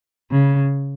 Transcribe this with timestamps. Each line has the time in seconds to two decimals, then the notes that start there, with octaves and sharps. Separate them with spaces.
0.31 C#3